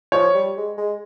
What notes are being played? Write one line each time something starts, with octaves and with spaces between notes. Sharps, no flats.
F3 C#5
G3
G#3
G#3